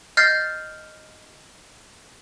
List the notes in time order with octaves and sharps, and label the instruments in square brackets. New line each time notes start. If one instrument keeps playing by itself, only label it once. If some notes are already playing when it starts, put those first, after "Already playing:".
[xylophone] D#5 F6 G6 A6 C7